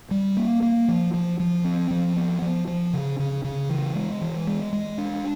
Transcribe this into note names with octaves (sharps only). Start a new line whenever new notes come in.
G3
A#3
A#3
F3
F3
F3
C4
F3
B3
F3
F3
C#3
C#3
C#3
E3
G#3
E3
G#3
G#3
D4